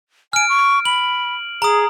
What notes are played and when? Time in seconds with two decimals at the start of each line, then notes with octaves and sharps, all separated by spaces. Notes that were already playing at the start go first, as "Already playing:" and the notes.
0.33 G#5 F6 D7
0.49 C#6
0.85 B5 F#7
1.62 G#4 A#5 D#6